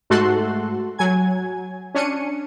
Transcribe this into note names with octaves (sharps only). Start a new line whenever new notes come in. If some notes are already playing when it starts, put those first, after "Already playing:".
G#2 A3 F#4 A4 C6 F#6
F#3 G#5 G#6
C#4 D4 C#7 D#7